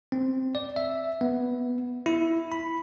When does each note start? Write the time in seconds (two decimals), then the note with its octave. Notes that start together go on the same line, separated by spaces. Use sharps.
0.12 C4
0.55 D5
0.76 E5
1.21 B3
2.06 E4
2.52 B5